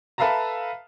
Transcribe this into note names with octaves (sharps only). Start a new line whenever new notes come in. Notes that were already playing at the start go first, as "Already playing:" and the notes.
A4 B4 E5 F5 A5 A#5